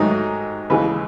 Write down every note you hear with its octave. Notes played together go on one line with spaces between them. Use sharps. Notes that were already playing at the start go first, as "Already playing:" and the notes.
Already playing: G#2 D#3 F#3 A3 D#4
D#2 C#3 E3 G#3 B4